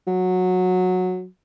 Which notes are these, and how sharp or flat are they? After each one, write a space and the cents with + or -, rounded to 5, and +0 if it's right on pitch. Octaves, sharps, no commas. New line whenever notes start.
F#3 -15